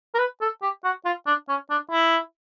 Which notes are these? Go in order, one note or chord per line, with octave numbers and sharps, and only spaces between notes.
A#4
B4
A4
G4
F#4
F4
D4
C#4
D4
E4